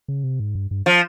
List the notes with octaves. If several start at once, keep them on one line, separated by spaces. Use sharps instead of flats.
C#3
C3
G#2
G2
G2
F3